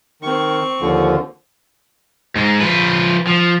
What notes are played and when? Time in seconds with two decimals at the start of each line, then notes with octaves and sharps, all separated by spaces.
0.22 D#3 C4 C#6
0.81 D#2 D3 F3
2.36 G#2 G#3
2.61 F3 B4
3.27 F3